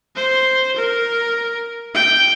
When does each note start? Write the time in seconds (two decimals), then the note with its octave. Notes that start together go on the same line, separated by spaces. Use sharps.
0.16 C5
0.76 A#4
1.94 G5